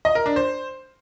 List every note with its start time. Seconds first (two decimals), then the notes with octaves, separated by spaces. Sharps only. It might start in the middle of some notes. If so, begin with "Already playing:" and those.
0.05 D#5
0.15 A#4
0.26 D4
0.36 C5